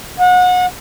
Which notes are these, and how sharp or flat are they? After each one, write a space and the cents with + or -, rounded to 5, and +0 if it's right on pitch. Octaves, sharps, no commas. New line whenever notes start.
F#5 -30